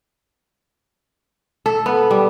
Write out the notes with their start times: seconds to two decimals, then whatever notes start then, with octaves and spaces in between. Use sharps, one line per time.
1.66 A4
1.86 B3
2.11 G3